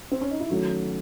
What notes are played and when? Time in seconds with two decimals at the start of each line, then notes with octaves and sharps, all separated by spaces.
0.11 C4
0.21 C#4
0.31 D#4
0.40 E4
0.50 D#3 F#3 A3 C#4 F#4